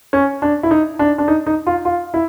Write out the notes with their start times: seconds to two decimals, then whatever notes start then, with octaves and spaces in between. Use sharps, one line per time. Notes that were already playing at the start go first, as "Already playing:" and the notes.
0.13 C#4
0.42 D4
0.63 E4
0.71 D#4
0.99 D4
1.18 D4
1.28 D#4
1.46 D#4
1.67 F4
1.85 F4
2.14 E4